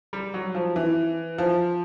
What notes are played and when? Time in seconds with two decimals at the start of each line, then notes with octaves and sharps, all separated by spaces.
0.13 G3
0.34 F#3
0.55 F3
0.76 E3
1.38 F3